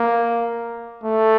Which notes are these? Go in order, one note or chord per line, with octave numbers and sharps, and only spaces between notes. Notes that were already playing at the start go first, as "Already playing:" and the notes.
Already playing: A#3
A3